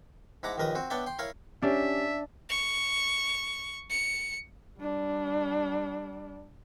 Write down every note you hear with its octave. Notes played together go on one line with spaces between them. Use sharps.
G#2 E4 F#5 A#5 D6
A#1 D#2 D#3 A#4 B4 D#6
C4 F#4
B3 D4 C#5 D5 E5 G5
G5 C6
E4 A#4 C#5 F5 B5
C#4 D4 G4 C#5 E5
C#6
C#7
G3 D4